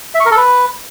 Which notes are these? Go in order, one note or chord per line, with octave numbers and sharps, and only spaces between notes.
E5
C#6
A#4
A4
B4